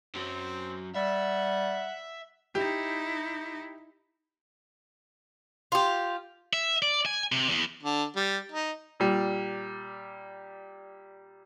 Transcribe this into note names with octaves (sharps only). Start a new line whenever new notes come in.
F#2 F#3 C4
G3 E5 F#5
D#4 E4 G4
F4 G4
E5
D5
G#5
C3
E2
D3
G3
D#4
A#2 G3